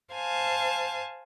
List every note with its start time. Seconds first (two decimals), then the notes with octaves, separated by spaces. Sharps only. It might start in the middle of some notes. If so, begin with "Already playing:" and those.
0.14 C5 F5 G#5 A5